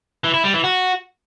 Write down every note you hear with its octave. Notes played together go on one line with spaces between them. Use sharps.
E3
E4
G3
E3
F#4